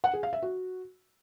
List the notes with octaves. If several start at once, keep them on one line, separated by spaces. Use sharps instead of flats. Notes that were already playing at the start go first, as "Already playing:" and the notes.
F#5
G#4
F5
E5
F#4